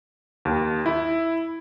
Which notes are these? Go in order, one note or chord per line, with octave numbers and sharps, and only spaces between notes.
D#2
E4